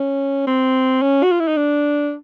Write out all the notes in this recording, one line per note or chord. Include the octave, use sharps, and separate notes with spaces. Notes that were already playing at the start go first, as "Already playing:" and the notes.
Already playing: C#4
C4
C#4
F#4
F4
E4
D#4
D4